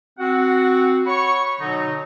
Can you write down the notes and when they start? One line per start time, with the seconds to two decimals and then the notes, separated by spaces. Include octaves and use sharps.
0.19 C4 F#4 F#5
1.06 C#5 F#5 B5 C#6
1.60 B2 D3 F#3 D#4